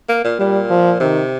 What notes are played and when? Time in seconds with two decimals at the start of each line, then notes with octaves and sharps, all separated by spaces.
0.09 A#3
0.24 A#2
0.39 A#2 G3
0.70 F3
1.00 C3 D#3